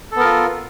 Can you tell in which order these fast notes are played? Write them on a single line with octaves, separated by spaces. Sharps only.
A4 B3 A#4 F4